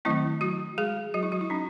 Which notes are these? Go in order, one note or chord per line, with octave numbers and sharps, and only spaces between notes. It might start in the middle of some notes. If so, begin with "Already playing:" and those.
D#3 F#3 A3 C4 E4
F#3 F#4
G#3 G#4
F#3 F#4
E4
F#3 F#4
E4
F#3 C#4 D#4